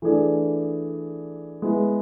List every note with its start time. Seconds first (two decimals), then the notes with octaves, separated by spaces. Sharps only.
0.02 E3 A3 D4 G#4
1.62 G#3 B3 E4